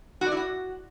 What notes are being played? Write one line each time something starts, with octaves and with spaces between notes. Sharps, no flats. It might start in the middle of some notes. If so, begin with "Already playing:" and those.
F#4
D5
E4
F#4